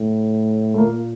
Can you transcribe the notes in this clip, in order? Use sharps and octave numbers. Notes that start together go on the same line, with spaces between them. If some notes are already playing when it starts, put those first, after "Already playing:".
Already playing: A2
A3
A#2 A#3